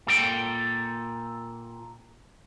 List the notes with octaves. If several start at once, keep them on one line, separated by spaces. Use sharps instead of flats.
A#2 A4 G5